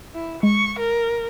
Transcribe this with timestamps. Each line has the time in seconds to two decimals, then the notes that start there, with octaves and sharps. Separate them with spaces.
0.14 E4
0.43 G#3 C#6
0.79 A#4